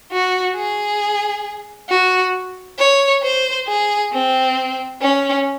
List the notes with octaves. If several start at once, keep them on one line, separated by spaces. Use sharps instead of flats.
F#4
G#4
F#4
C#5
C5
G#4
C4
C#4